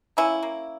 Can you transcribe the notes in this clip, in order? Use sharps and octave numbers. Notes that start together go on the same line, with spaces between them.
A#3 C#4 E4
A#3